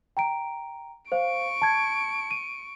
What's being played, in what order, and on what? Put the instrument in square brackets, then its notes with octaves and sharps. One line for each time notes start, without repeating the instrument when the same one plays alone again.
[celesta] G5 A#5 D7
[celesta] C5 F5 [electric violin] C#6 D7
[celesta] A5 G#6
D#7